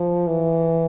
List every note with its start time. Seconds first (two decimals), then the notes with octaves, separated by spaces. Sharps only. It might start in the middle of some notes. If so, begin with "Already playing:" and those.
Already playing: F3
0.27 E3